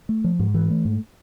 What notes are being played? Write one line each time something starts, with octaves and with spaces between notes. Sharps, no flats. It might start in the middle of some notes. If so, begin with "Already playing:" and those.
A3
F3
G#2
E3
A3
G#2